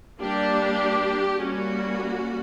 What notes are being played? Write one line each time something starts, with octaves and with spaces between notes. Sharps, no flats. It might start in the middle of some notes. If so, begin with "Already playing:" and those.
G3 A#3 D4 G4
G3 A#3 C#4 F#4